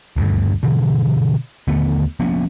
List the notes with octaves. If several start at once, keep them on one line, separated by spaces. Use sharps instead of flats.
D#1 D2 G2
G2 B2 D3 E3
D#2 D3 A3 B3
F3 A#3 B3 C#4